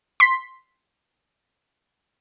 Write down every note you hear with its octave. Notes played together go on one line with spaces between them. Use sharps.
C6 B6